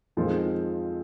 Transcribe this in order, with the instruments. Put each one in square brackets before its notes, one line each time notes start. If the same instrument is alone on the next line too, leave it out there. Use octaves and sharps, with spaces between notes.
[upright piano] F2 D#3 G#3 C4 F4 [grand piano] F3